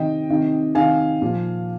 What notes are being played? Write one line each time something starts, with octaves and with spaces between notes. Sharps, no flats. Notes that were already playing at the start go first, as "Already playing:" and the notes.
Already playing: C3 D#3 D#5 G5
C3 D#3
C3 D#3 F5 G#5
A#2 F3